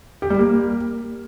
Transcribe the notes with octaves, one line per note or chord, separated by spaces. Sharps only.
G4
G3
A#3